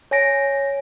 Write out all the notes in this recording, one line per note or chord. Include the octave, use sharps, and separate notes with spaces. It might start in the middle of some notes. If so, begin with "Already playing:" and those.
C#5 G#5 A#6 D7